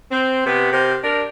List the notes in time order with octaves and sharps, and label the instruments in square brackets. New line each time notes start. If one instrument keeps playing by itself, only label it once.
[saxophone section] C4
C3 B3
C3 A#4 C5
D4 A#4